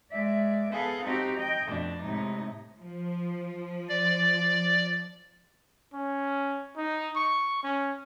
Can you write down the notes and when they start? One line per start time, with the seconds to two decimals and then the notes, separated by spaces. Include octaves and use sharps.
0.11 G#3 D5 E5
0.72 B3 G#4 A4 F5
1.04 C4 D#4 F#4 G4
1.37 D#5 G5
1.67 F2 B2 A3 D4
2.02 A2 C3 G#3 D#4
2.80 F3
3.89 D5
5.93 C#4
6.77 D#4
7.15 C#6
7.63 C#4